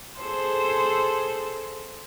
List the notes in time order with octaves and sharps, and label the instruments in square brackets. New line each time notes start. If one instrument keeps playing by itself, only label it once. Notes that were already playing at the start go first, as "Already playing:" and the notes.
[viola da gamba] G#4 A4 C5